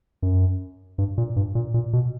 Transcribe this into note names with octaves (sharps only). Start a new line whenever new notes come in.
F#2
G2
A#2
G2
A#2
A#2
B2